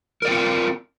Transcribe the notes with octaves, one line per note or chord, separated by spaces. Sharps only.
C4 F4 A#4 D5